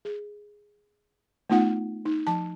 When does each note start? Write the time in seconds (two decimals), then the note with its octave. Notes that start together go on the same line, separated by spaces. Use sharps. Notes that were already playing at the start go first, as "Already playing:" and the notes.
0.05 G#4
1.50 A3 B3 D#4 F4 F#5
2.05 D#4
2.27 F3 A5